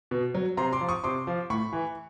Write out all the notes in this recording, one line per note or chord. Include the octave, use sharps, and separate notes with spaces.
B2
F#3
C3 A#5 C6
C6 D6
F3
C#6 D#6
C3 C6 D6
F3
A2 B5 C#6
E3